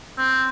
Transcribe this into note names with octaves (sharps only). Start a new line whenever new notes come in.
C4